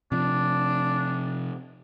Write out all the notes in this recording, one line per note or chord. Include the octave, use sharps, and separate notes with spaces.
C3 F3 D4